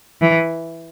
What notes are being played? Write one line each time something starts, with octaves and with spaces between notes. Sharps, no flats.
E3